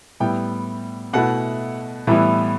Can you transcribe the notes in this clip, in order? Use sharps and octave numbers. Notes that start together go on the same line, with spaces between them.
A2 G3 B3 E4 G5
B2 A3 E4 F#5
A2 E3 G3 B3 E4